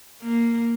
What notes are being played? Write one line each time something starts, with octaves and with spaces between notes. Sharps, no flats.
A#3